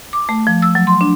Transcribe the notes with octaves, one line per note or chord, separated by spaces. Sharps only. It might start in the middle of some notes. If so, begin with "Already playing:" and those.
D6
A3
F3
E6
F#3
C6
D4